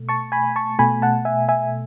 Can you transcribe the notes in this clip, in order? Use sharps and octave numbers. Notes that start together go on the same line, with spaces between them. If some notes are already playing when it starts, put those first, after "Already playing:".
Already playing: B2 A3
A5 C#6
G#5 B5
A5 C#6
B2 A3 G#5 B5
F#5 A5
E5 G#5
E5 G#5